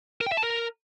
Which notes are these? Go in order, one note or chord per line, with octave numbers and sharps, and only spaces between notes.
A#4
G5
E5
A5
A#4